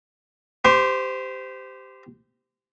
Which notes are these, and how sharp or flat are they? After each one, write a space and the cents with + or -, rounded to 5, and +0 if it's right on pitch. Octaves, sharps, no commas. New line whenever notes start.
G4 +0 C5 -25 C6 +40